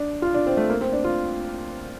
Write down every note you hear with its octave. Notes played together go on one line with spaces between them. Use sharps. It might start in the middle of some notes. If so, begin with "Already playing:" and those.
Already playing: D4
F4
D4
C4
A3
A#3
C4
D4
F4